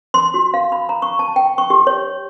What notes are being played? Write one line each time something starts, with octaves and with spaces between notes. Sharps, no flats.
C6
F#4
F5
B5
A#5
C#6
A5
G5
C#6
G4
C#5